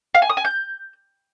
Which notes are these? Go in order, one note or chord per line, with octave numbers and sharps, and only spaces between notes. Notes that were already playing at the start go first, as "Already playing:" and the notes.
F5
G#5
D#6
G#5
G6